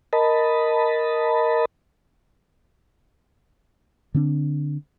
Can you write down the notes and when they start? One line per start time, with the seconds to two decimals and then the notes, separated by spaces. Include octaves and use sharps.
0.13 A#4 D#5 A5 B5
4.14 D3 C4 D4